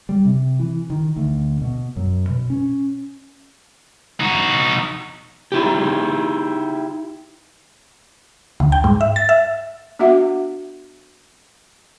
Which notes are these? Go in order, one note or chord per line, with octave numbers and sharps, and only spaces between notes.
G3
C3
E3
D#3
D2
B2
F#2
B2
C#4
D#4 F#4
D#4 E4 G4
D2
G5
G#2
E5
A6
E5
B3 D4 F#4 E5 F#5